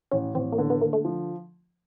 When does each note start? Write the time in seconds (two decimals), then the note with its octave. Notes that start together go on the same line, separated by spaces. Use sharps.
0.11 A1 C#4
0.34 A1 C4
0.52 A#3
0.58 D3 B3
0.70 B3
0.81 D3 A#3
0.93 A3
1.05 F3